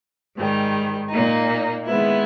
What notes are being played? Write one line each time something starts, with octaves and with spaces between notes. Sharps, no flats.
G#2 D#3 G3
A#2 A#3 D#4
D#3 G#3 B3 E4